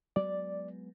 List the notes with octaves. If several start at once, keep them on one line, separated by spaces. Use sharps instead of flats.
F#3 G#3 B3 D5